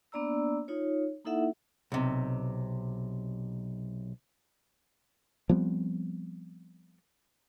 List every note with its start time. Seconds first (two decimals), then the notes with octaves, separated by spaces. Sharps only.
0.12 A#3 B3 D4 D5 A#5 E6
0.68 D#4 F4 C#5
1.25 A#3 D#4 E4 A4 E5 F#5
1.92 B1 C3
5.49 F3 G3 B3 C4